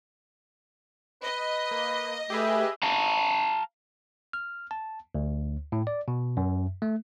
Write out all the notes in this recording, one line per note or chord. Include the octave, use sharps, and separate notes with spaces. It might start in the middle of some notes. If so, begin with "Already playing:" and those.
B4 D#5
A#3
A3 G4 G#4 B4 E5
F5 A5 A#5
F6
A5
D2
A2
D5
B2
F#2
A3